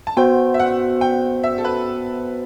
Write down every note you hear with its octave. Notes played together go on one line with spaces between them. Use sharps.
A5
B3 F#4 C5 G5
E5
F#5
G5
E5
A4
B4